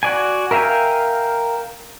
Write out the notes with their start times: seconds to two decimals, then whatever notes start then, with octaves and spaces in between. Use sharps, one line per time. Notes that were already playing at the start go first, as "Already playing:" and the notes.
0.03 F#4 D5 G#5
0.51 A#4 E5 F5 G5 G#5